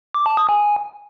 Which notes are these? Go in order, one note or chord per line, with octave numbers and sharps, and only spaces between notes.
D6
A5
D#6
G#5